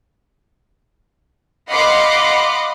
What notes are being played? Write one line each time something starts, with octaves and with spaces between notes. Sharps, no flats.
D#5 F5 F#5 B5 C6 D6